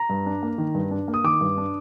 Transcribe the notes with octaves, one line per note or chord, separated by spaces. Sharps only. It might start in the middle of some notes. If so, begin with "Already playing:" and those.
Already playing: A#5
G2
D4
A#3
D#3
G2
D4
A#3
D#6
D#3 D6
G2
D4